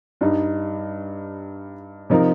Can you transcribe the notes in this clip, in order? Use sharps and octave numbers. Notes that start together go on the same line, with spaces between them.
G2 G3 D#4
C3 F3 D#4 A#4